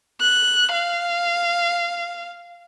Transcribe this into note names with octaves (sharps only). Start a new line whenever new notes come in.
F#6
F5